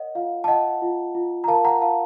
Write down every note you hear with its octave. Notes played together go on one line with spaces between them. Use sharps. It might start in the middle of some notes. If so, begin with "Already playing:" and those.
Already playing: A#4 C#5 D#5 F#5
F4 F5
A5
F4 D#5 F#5
F4
F4
A#5
A#4 F5 A5
F#5 A#5
F4 F5 A5